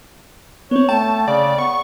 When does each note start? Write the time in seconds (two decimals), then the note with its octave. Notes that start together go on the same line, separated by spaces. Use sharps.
0.71 B3 C4 C#5
0.89 A3 G5 A5
1.28 C#3 D5
1.59 B3 C#6